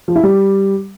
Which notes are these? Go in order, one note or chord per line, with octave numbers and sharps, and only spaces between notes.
F3
E4
G3